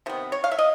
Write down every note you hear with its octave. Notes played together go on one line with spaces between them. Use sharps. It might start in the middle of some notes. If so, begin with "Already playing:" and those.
C3 D#3 B3
C#5
F5
E5
D#5